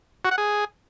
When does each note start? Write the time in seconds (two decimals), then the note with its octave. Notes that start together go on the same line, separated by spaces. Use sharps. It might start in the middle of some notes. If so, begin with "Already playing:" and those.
0.25 F#4
0.31 F#5
0.38 G#4